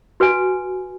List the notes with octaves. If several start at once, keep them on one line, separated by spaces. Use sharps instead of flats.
F#4 B4 G#5